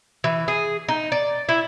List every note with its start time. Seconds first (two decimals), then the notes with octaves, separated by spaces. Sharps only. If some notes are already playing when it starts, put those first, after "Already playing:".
0.24 E3
0.48 G#4
0.89 D#4
1.12 D5
1.49 E4